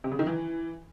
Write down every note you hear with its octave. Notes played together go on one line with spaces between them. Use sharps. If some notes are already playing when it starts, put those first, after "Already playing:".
C3
C#3
D#3
E3